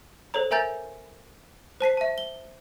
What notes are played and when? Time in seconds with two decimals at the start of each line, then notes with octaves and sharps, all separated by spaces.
0.34 A4 C5 C#5 A#5
0.51 A#4 E5 G#5 A#5 G6 A6
1.81 C5 A5 B6 C7
1.97 E5 A5
2.18 G7